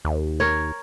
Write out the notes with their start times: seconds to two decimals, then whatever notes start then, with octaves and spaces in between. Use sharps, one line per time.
0.05 D#2
0.40 A#4 C#5